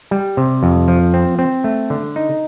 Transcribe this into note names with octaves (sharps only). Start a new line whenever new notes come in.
G3
C3
F2
F3
C4
C4
A3
D3
D#4